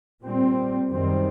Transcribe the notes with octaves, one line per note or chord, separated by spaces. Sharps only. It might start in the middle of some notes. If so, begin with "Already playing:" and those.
A#2 G3 C4
F#2 D#3 G3 C4